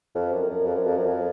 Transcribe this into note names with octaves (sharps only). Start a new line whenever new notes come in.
F2
F#2
F#2
F2
F#2
F2
F#2
F2